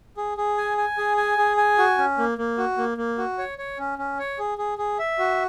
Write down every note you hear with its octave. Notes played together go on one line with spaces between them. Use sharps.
G#4
G#4
G#5
G#5
G#4
G#5
G#4
G#5
F#4
C#4
A#3
A#3
F#4
A#3
A#3
F#4
C#5
C#5
C#4
C#4
C#5
G#4
G#4
G#4
E5
F#4